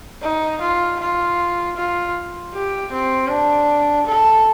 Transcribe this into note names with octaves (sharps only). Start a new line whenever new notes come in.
D#4
F4
F4
F4
G4
C4
D4
A4